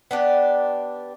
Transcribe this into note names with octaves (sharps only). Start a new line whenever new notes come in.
B3 D4 G4